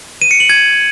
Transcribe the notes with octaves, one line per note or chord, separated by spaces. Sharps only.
D#7
C#7
F#7
G#6